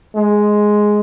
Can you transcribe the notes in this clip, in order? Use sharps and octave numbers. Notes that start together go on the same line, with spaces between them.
G#3